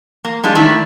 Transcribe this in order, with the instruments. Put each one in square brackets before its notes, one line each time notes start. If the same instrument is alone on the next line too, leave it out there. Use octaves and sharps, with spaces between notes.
[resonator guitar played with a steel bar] A#3
G3 G#3 D4 F4
D#3 A3 D4 E4